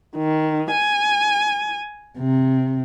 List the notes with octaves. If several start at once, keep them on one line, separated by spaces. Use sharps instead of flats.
D#3
G#5
C3